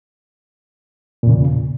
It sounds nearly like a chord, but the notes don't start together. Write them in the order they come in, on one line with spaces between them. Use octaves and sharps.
A#2 E2 C#3